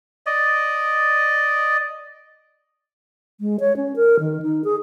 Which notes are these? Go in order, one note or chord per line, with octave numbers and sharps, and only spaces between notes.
D5 D#5
G#3
C#5
C#4
A#4
D#3
D#4
G#4